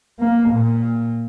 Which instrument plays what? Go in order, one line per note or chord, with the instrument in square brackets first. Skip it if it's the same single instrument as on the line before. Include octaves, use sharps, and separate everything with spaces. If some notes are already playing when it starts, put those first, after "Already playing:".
[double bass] A#3
A#2